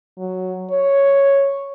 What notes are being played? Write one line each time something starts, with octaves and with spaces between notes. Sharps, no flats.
F#3
C#5